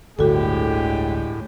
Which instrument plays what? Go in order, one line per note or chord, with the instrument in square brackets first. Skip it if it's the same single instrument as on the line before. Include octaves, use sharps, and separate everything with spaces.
[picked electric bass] G1 D2 [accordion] A2 [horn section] D3 G#3 G4 [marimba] F#4 A4